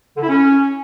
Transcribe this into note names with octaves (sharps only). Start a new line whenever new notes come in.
D3
E4
C#4